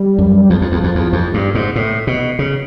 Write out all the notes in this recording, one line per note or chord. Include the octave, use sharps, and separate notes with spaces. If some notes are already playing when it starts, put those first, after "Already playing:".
Already playing: G3
F#2
E2 F3
F2
E2
F2
E2
F2
G2
G#2
A2
B2
C#3